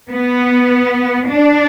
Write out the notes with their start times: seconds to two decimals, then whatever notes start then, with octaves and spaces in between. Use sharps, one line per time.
0.10 B3
1.30 D4